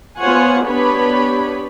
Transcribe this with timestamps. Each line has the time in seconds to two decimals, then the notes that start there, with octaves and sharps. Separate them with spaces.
0.19 B3 F4 C5 C#5 F#5 G#5
0.66 B3 D4 G4 B4 C#5 B5